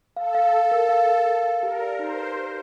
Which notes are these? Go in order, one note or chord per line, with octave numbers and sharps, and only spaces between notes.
A4 F5
F5
F5
A#4
F5
A#4
A#4
F5
G4 A#4
D5
D#4 C5
B4
G4